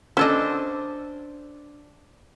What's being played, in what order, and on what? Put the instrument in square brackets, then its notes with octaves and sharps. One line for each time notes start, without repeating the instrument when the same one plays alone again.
[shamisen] C#4 A4 D#5 [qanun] D4 C5